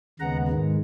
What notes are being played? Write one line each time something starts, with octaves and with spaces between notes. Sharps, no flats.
D#2 C#3 G#3 B3 F#5 A#5
G#2 D#3 G#3